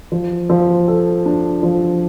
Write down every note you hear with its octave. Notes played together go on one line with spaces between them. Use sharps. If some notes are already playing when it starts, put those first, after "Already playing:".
F3
F3
A4
D4
F3